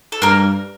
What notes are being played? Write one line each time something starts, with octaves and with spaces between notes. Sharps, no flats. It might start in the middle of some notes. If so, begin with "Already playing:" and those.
A4
G2 A#3 A#4